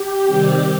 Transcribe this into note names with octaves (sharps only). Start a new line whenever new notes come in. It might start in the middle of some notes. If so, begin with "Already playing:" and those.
Already playing: G4
C3 D#3 G3 C4